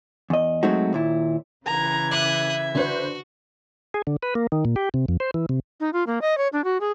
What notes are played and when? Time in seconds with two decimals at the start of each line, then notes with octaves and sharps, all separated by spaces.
0.30 E2 D#5
0.63 F#3 G#3 A3 C4 D#4 F#4
0.93 D#2 A#2 E4
1.66 C#3 E3 A#5 G#6
2.11 E5 D6 D#6 F#6
2.75 D3 F#4 B4 C5
3.94 G#4
4.07 D3
4.23 B4
4.35 A#3
4.52 D#3
4.65 A#2
4.76 G4
4.94 C3
5.08 F2
5.20 C5
5.34 E3
5.49 C3
5.80 D#4
5.93 F4
6.07 A#3
6.21 D#5
6.37 C#5
6.53 D4
6.64 F#4
6.80 G#4